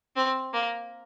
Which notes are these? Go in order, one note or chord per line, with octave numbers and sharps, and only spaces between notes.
C4
A#3